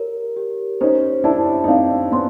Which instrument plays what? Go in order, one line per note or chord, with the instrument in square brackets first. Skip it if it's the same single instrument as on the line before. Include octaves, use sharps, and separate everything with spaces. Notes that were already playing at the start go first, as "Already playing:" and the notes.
Already playing: [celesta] G4 A#4 C#5
G4
[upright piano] C#4 D#4 [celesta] C5
[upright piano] D4 E4 [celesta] A5
[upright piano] D#4
[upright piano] C4 D4 [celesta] F5
[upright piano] B3 C#4 [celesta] C6